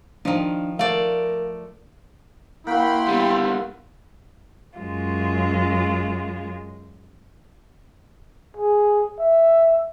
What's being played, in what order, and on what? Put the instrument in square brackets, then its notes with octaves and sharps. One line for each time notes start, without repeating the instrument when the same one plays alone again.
[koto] D#3 F3 [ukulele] D4
[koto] A3 D5 [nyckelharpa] A#4 [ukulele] F5
[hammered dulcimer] A#3 F#4 [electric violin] E4 C6 [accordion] G5 B5
[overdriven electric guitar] G3 B3
[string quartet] F#2 G#3 F4
[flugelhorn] G#4
E5